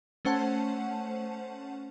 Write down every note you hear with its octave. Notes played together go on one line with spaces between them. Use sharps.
A3 C#4 C5 F#5 A5